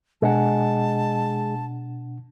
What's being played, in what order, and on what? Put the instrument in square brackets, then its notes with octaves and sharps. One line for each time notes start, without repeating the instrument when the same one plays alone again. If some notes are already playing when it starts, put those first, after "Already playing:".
[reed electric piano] B2 D4 F#5 [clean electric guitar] G#3 [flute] A5